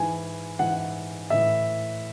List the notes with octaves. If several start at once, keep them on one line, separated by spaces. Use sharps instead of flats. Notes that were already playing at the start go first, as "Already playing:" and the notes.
Already playing: G#2 E3 G#5
G#2 E3 F#5
A2 E3 E5